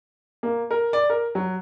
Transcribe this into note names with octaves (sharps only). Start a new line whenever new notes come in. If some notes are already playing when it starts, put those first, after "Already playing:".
A#3
A#4
D5
A#4
F#3